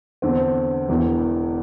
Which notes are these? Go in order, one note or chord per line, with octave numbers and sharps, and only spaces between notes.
E2 D3 C4
E1 E2 E3